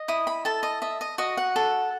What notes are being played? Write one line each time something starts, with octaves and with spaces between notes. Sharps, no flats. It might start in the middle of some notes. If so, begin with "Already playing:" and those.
Already playing: D#5
E4 D#6
B5
A4 A5
D#5
D#5 E5
D#5
F#4 D#5
F#5
A4